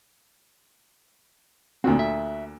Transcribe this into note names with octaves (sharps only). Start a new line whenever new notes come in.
D2 A#2 D3 C4 F#4
E5